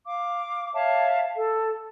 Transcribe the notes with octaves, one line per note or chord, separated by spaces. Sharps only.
F5 D6
C#5 E5 F5 A5
A4